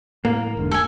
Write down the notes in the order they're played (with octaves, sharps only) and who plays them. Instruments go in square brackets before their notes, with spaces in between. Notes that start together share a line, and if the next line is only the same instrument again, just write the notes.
[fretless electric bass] A2 [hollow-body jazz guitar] A#3
[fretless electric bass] E1 G#2 D3
[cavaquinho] A4 G#5